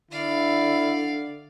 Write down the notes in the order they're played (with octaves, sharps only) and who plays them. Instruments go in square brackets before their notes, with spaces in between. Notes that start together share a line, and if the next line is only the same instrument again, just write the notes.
[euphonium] D3 [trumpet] E4 [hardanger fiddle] D5 F5